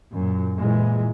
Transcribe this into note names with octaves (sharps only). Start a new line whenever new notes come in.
F#2 A#2
A#2 E3 G#3